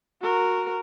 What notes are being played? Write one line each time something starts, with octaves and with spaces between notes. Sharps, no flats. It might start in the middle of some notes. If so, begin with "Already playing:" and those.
F#4 A#4